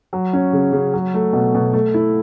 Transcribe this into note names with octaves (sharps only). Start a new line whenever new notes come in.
F#3
C#4
C#3
C#3
F#3
A3
B2
B2
A3
E4